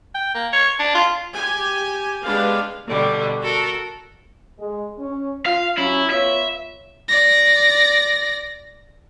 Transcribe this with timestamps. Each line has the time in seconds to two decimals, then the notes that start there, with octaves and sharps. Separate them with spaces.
0.15 G5
0.35 A#3
0.53 C#5
0.79 D4
0.95 F4
1.34 G4 G#5
2.24 G#3 B3 D4 G4 B4 F5
2.88 B2 D3 G3
3.41 F#4 A4 A#4
4.59 G#3
4.98 C#4
5.46 F4 F5
5.78 F#3 C#4 E4
6.10 B3 F4 C#5 E5
7.08 D5 A#6